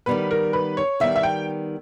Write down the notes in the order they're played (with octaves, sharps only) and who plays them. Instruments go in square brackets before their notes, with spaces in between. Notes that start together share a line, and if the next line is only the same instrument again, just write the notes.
[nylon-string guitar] D#3 G3 B3 [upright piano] B4
[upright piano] A#4
B4
C#5
[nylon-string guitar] D#3 G3 B3 [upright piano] E5
[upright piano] E5
G5